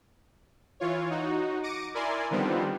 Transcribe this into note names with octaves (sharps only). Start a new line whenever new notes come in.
E3 F4 C#5
D#4 F#4
D6 A#6 C#7 D#7
E4 A#4 D5 G#5 C6
D3 D#3 F3 G3 B3 C4